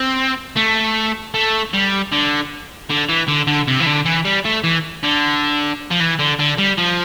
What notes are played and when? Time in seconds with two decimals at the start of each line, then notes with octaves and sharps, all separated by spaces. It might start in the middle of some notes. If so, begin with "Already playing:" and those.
Already playing: C4
0.56 A3
1.34 A3
1.73 G3
2.12 D3
2.90 D3
3.09 E3
3.28 D3
3.47 D3
3.68 C3
3.80 E3
3.86 D3
4.05 E3
4.25 G3
4.45 A3
4.64 E3
5.04 D3
5.91 F3
6.00 E3
6.19 D3
6.39 D3
6.59 G3
6.78 F3